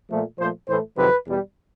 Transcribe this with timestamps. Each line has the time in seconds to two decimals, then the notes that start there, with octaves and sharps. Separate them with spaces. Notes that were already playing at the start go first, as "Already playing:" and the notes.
0.10 A#2 F3 A3
0.39 A#2 F3 A3 C5
0.68 A2 E3 A3 C5
0.97 F2 C3 D#3 F#3 B4
1.26 E2 B2 G3